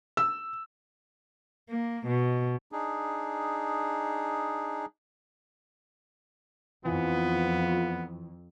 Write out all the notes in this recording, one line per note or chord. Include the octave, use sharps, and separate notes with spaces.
E6
A#3
B2
D4 D#4 G#4
F2 E3 B3 F4